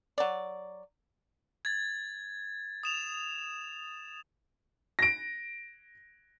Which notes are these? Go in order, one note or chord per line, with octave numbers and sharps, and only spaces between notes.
F#3 D5
G#6 A6
D#6 E7 F7
A#6 D7